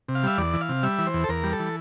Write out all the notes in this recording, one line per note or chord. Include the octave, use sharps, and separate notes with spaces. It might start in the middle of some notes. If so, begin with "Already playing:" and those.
C3
F5
G3 E5
E2 D5
E3
F5
C3
G3 E5
E3
C5
E2
A4
E2 A#4
G3
A4
E3